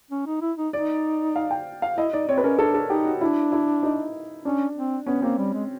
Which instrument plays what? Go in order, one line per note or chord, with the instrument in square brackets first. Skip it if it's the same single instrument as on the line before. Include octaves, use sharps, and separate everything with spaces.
[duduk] C#4
D#4
E4
D#4
[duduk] D#4 [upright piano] D5
[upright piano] F5
G5
F5
[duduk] E4 [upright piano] D#5
[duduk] D#4 [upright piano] D5
[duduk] C4 [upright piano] C#5
[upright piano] B4
[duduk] C#4 [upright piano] A#4
[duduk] D4 [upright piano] A4
[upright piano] A4
[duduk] D#4 [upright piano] G4
[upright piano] F#4
[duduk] D4 [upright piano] E4
[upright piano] E4
D#4
[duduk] C#4 [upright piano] D4
[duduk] C4
[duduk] B3 [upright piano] C#4
[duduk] A#3 [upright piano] C4
[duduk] G3
G#3